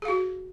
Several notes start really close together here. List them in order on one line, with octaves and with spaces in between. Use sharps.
G#4 F5 F#4